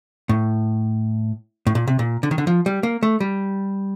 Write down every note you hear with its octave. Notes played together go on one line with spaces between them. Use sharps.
A2
A2
A#2
C3
A#2
D3
D#3
D3
F3
G3
A#3
A3
G3